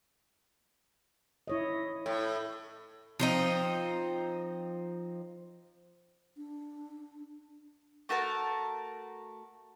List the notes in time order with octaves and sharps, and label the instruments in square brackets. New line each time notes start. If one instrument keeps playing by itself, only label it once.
[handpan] E4 C#5 D#5
[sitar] A2
[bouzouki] F3 C4 D#4
[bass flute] D4
[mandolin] A3 F#4 A#4 A5